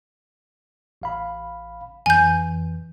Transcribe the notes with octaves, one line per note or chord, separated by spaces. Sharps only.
A1 F5 B5
F2 E3 G#5 G6